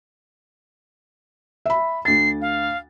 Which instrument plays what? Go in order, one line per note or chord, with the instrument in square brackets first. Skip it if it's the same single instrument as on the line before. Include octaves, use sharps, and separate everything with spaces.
[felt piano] E5 B5
[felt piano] D2 A6 [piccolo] C7
[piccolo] F5